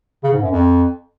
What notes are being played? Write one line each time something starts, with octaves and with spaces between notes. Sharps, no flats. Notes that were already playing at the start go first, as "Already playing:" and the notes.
C#3
G#2
F#2
F2